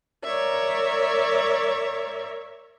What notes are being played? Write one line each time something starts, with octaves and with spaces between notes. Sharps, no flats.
A#4 C#5 D5 E5